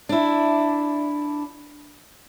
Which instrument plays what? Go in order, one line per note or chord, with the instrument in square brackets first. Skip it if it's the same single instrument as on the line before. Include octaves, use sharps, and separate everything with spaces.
[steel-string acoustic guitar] D4 E4